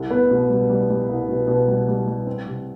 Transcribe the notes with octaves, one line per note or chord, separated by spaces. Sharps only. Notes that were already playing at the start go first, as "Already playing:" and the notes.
Already playing: C2
B3
B2
G3
G3
G3
C2
B2
B2
G3
G3
G3
C4
C3